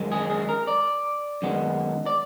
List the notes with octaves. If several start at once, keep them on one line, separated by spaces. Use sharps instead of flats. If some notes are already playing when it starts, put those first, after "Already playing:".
Already playing: F#2 D#3 G#3
G#4
G#4
A#4
D5
F#2 D#3 G#3 B3
D5